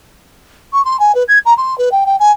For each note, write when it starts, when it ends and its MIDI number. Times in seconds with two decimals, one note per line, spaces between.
0.73 0.84 85
0.84 0.99 84
0.99 1.14 80
1.14 1.23 71
1.28 1.38 92
1.45 1.53 82
1.57 1.77 84
1.78 1.89 71
1.91 2.04 79
2.06 2.16 79
2.19 2.31 80